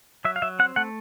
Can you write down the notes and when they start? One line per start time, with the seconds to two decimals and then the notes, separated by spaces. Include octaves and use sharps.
0.25 F#3 E5
0.36 F5
0.42 F#3 E5
0.59 C4 F#5
0.76 A3 F#5